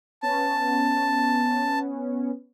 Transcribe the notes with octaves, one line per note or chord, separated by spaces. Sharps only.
B3 C#4 A5